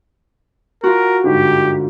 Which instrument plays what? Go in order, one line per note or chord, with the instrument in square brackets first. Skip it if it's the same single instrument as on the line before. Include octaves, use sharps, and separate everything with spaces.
[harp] F4 F#4 [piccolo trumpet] A#4
[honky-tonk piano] G1 G#2 [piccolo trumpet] G4